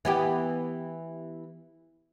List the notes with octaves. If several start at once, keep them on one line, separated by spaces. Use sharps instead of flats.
E3 B3 G4